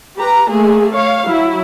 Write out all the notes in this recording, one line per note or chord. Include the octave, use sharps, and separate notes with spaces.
G4 B4 A#5
A3 A#3 G#4
C#5 F5
F#3 E4